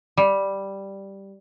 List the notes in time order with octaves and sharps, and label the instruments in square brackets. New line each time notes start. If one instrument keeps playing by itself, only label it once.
[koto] G3